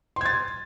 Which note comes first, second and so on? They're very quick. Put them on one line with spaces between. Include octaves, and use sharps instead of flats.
C6 G#6 A6